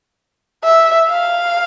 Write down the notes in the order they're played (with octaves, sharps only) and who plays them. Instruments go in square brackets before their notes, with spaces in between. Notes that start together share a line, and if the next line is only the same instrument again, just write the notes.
[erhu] E5
F5